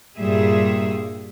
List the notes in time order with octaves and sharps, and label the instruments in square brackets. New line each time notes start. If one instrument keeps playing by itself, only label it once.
[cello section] G2 A#2 G3 G#4 E5